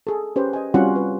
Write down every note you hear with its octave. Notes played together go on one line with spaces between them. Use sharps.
G#4 A4
C#4 G4 B4 C5
D#5 G#5
G3 C4 C#4 F4 F#4 F#5
B4